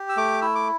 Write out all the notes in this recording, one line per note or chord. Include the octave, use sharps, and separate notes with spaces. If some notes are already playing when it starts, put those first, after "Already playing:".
Already playing: G4
E6
A3 D6
E4 E6
D6